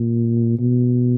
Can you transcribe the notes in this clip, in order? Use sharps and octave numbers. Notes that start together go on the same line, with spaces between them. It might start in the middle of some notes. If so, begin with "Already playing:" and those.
Already playing: A#2
B2